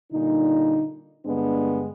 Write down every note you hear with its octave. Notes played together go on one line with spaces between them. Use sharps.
A#2 D3 G3 D#4
G2 D3 G#3 B3 D4